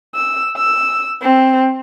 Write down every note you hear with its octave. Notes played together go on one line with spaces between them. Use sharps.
E6
E6
C4